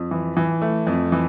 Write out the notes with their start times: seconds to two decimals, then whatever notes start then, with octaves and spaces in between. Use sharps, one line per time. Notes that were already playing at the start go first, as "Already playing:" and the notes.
Already playing: F2
0.11 E3
0.37 E3
0.62 A3
0.87 F2
1.12 E3